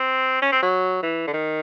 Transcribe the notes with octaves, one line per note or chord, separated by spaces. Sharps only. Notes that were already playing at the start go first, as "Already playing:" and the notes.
Already playing: C4
C#4
C4
F#3
E3
D3
D#3